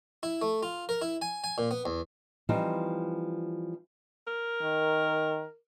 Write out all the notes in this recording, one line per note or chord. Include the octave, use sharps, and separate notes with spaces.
E4
A3
F4
A#4
E4
G#5
G#5
A#2
B3
E2
E3 F3 G3 C4 D#4
A#4
D#3